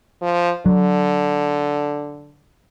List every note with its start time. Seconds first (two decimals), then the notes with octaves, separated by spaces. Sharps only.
0.22 F3
0.66 D3 F#3